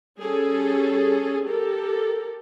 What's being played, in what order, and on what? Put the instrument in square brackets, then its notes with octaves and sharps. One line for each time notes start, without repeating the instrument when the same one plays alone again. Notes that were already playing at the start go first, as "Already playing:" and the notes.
[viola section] G3 C#4 G#4 A4
G4 A4 A#4